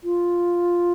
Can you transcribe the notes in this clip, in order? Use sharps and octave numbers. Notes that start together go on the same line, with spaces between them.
F4